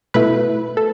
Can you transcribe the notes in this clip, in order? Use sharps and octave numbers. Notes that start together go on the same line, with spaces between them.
B2 A3 E4 B4
A4